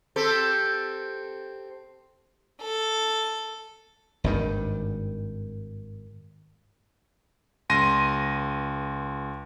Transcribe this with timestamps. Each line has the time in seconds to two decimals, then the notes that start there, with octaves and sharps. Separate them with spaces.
0.16 C4 G4 A4
2.62 A4
4.24 G#1 G2 D#3
7.70 C#2 C6 A#6 D#7